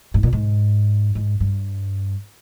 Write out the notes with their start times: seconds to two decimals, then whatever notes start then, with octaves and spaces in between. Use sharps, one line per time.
0.14 G#2
0.23 A#2
0.33 G#2
1.15 G#2
1.40 G2